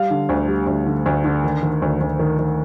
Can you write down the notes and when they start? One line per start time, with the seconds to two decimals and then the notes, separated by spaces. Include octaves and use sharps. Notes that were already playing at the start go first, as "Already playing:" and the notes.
Already playing: G3 F5
0.11 D3
0.29 D2
0.48 G3
0.67 D2
0.86 D3
1.06 D2
1.24 D3
1.44 D#3
1.63 D#3
1.82 D2
2.01 D2
2.19 D#3
2.39 D#3